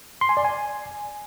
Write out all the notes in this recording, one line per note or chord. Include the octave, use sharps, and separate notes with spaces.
C6
G#5
D5
G#5